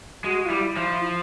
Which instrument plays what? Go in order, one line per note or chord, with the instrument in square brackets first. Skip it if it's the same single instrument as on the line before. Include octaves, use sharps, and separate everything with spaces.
[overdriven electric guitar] G#3 [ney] F#4
[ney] F4
[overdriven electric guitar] G3 [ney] E4
[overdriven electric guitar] F3 [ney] E4
[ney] E4
F4